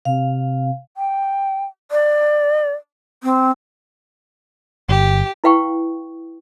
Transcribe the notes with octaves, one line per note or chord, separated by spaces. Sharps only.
C3 F5
G5
D5
C4
G1 G4
E4 B4 F5 G5 C#6